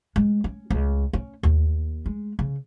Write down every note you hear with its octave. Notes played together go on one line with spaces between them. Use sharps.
G#3
C#4
C#2
C#4
D#2
G#3
C#3